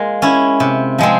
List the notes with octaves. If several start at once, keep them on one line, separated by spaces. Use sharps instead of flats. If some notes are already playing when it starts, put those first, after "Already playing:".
Already playing: G#3 A#3 F4 A#4
C#4 E4
C3
F3 G#3 C4